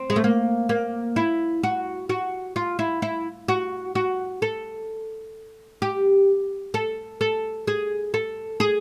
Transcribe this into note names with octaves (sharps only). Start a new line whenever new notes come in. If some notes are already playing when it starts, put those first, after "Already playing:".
Already playing: C4
G#3
A3
A#3
A#3
E4
F#4
F#4
F4
E4
E4
F#4
F#4
A4
G4
A4
A4
G#4
A4
G#4